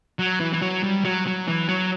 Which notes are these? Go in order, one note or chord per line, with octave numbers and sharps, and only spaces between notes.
F#3
E3
E3
F#3
G3
F#3
F#3
E3
F#3